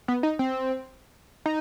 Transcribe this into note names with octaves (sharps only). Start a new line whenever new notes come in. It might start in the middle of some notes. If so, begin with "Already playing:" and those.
B3
D#4
C4
D#4